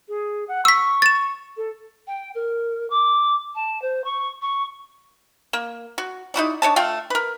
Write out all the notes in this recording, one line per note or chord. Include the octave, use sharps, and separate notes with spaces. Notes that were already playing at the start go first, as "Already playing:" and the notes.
G#4
F#5
C#6 E6 B6
A6 E7
A4
G5
A#4
D6
A5
C5
C#6
C#6
A#3
F#4
D#4 E4 F#4 D5
D4 C#5 D#5 A5
A3 F4 F5 G5
A#4 B4